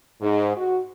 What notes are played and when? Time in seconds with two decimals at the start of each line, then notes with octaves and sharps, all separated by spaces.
0.21 G#2
0.57 F#4